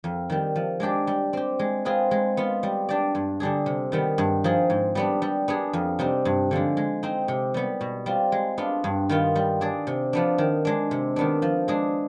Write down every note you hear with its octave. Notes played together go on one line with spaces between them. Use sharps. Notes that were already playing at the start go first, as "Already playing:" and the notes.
F2
D#3 G3
F3
G#3 D4 G4 D5
G3
C4 G4
G#3
C4 F4 G#4 B4
G#3
B3 F4
G3
D4 G4 D5
G2
D3 G3 D4 G#4
C3
D#3 G3 B3
G2
F3 C4 D#4 G#4
G#2
G3 B3 D4
G3
B3 D4 G#4
F2
C3 G3 C4 D#4
G2
D3 F3 G#3
G#3
C4 D#4
C3
G3 B3
B2
G3 C4 F4
G#3
B3 D4 F4
G2
D#3 B3 F4
G3
D4 G#4 D5
C3
F3 B3 D4
D#3
G#3 D4
C3
D#3 B3 D4
F3
G#3 D4 G#4